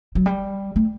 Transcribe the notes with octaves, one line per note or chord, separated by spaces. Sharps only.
F#3
G3
A3